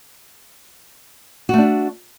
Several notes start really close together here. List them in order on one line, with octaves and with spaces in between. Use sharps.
F#4 A3 D4